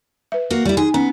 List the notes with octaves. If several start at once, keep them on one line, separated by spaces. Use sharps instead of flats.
B4 E5
A#3 F#4
G3 E4
D#4 G#4
B3 C#4